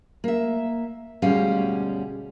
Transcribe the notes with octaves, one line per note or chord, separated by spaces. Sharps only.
A#3 E5
D2 B2 G3 G#3 C#4 F5